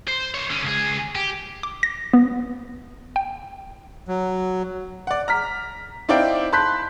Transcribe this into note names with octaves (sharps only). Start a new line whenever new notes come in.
C5
C5 C#5
D3 C#4
C#2 G#4
G4
D6
A#6
B3
G5
F#3
D5 F#5
A#5 F6 B6
C4 D#4 E4 D5 F5 G5
A5 B5 C6 F#6 G6 B6